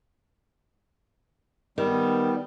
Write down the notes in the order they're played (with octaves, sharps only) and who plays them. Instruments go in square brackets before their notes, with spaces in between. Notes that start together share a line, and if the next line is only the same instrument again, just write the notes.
[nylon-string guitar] D#3 [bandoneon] G3 [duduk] B3